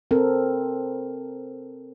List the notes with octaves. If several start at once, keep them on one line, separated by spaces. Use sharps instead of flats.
C4 A4 A#4